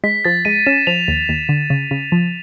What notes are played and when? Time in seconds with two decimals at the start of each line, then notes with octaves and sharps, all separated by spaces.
0.04 G#3 B6
0.25 F3 A6
0.45 G#3 D#7
0.66 C#4 E7
0.87 F3 F7
1.08 D#2
1.29 D#2
1.49 D3
1.70 C#3
1.91 C#3
2.12 F3